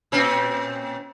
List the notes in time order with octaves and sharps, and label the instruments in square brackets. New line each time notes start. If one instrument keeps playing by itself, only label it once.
[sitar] A#2 C4 C#4